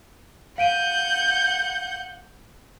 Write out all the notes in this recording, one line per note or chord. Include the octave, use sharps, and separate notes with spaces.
F5 F#5 G6 D7 D#7